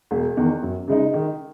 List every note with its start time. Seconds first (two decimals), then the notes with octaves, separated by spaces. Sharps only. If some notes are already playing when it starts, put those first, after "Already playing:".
0.11 E1
0.37 E2 D#3
0.63 F#2
0.88 C#3 G#3 D#4
1.14 D#3